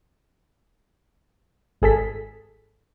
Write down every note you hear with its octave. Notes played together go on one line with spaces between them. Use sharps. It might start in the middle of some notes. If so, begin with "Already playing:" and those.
G#1 G#4 A4 B6